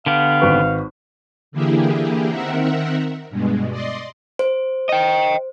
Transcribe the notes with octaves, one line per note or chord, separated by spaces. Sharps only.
D3 B3 G4 F5
G#1 B4 C#6
D3 E3 A#3 E4 G4 G#4
D#3 C4 A#4 E5 F#5
G2 B2 G#3
D5 D#5 C6
C5
D#5 G5